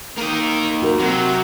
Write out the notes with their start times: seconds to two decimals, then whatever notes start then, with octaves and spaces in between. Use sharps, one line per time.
0.18 A#3 D#4 A#4 D#5
0.82 F#4 A#4
0.99 C3 F#3